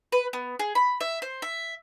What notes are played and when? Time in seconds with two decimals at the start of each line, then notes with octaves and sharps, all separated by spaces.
0.12 B4
0.33 B3
0.59 G#4
0.75 B5
1.01 E5
1.22 C5
1.42 E5